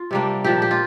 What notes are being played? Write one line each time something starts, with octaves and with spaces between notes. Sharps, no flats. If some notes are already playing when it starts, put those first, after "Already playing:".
Already playing: F4
C3 G3 A#3 D4
A#2 F3 D4 G4
G4
F4